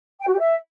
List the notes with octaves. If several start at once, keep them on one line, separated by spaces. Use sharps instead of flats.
G5
F#4
G4
E5